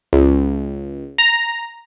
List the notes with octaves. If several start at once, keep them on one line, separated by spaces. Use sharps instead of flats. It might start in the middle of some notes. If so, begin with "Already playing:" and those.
C#2
A#5